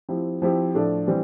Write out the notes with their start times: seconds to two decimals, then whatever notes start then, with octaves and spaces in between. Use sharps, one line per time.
0.09 F3 C4 E4 G4
0.42 F3 C4 E4 G4
0.74 A2 F3 A3 D4 A4
1.07 E3 G3 C4